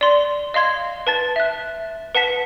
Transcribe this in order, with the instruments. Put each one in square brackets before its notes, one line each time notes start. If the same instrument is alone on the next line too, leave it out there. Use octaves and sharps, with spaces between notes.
[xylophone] D5 C6
D#5 F5 C6 G#6
B4 A5 A6
E5 F#6
B4 F#5 A5 B6